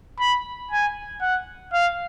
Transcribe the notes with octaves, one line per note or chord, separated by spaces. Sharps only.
B5
G#5
F#5
F5